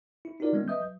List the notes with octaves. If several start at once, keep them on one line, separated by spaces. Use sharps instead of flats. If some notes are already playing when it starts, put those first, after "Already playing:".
E4
D#4 F4 F#4 A#4 D5
D#3 G3 G#3 B3 C#4
B4 D#5 E5 D#6 G6
F#3